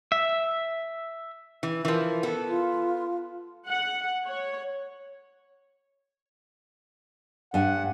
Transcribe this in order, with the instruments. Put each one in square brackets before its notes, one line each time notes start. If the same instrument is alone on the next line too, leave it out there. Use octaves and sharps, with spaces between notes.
[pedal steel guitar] E5
[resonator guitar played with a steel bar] E3
[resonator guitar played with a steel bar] E3 F3 [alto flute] A#4
[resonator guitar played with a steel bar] B3 A4
[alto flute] F4
[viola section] F#5
C#5
[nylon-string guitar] G2 G#5 [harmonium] F#5